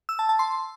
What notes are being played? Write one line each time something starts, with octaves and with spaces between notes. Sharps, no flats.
E6
A5
A5
C6